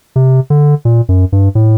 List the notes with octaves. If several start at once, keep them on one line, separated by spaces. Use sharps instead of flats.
C3
D3
A#2
F#2
G2
A2